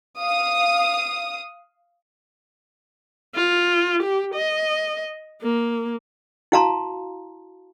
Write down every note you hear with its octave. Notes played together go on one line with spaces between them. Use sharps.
F5 D#6
F4
G4
D#5
A#3
E4 F#4 F5 A5 A#5 C6